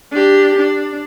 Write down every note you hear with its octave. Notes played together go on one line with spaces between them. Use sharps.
D4 G4
D4